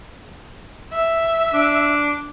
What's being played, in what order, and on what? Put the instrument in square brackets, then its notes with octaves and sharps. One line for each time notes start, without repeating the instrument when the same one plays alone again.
[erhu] E5
[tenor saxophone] D4